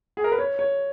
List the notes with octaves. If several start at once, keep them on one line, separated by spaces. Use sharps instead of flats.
G#4
A#4
B4
C#5
C#5